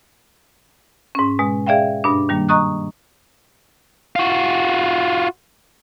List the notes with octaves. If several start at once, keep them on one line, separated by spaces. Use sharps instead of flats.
G#2 C#4
B2 G#3
G#4 D5 E5 F5 G5
G2 B2 D4
D#3 G3 A#3
D#5 A#5 C#6 D#6 F#6
F4 F#4